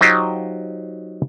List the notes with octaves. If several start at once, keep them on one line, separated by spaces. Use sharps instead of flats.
F#3 D#4 F4 G4 C5 D#5